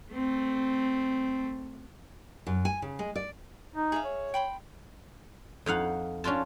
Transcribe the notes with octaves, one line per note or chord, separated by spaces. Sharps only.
A3 C4
F#2
G#5
C#3
G#3
D5
D#4
G#4 E5 F5
C#5
G5 B5 C6
F2 D#4 F5 F#5
C#4 D4 F4 A5